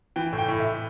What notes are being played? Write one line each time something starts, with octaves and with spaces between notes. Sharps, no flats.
E3 G5
A2
G5
A2
A2 E5